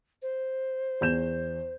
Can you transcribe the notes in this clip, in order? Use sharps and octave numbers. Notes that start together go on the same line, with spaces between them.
C5
E2 G6 E7